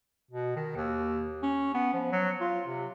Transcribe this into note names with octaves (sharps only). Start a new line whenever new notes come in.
B2
D#3
D#2
C#4
B3
F3
F#3
F4
C3